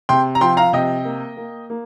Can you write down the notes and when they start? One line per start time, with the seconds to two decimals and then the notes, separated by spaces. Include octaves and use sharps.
0.09 C3 G5 C6
0.35 A#5
0.41 F3 G5 C6
0.57 F5 A#5
0.73 C3 D#5 G5
1.05 A#3
1.37 A#3
1.70 A#3